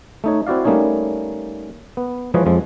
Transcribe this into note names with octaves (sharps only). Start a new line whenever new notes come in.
A3 D#4 C#5
C4 E4 F#4 D5 F5
G3 A3 A#3 C#4 D#4 C#5
B3
E3 F3 G#3 B4 C#5 D#5
F2 F3 G#3